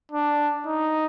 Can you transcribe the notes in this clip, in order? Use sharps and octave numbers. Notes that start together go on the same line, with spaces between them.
D4
D#4